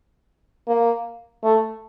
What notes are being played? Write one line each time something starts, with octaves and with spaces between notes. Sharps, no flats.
A#3
A3